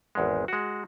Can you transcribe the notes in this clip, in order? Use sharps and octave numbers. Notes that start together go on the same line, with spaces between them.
G#1 E2 G#3
G#3 F#4